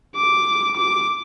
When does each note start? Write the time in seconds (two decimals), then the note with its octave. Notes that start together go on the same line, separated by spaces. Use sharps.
0.16 D6
0.76 D6